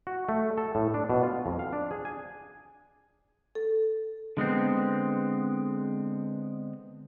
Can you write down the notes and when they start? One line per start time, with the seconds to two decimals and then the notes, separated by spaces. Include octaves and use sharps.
0.07 F#4
0.29 A3
0.58 A4
0.75 A2
0.94 D4
1.10 B2
1.23 F4
1.46 F2
1.59 F5
1.73 D4
1.91 G#4
2.05 G#5
3.55 A4
4.37 D3 G#3 B3 C4